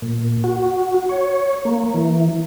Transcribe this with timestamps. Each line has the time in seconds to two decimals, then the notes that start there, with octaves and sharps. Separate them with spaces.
0.02 A#2
0.44 F#4
1.09 C#5
1.65 A#3
1.94 E3